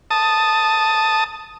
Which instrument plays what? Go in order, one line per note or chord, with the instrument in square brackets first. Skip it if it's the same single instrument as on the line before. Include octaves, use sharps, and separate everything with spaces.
[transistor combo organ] A5 D#6